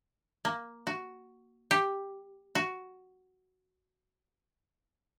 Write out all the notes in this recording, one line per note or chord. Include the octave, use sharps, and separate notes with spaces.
A#3
F#4
G4
F#4